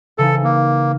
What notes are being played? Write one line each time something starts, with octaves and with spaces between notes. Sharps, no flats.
C#3 E3 D#4 A4
A#3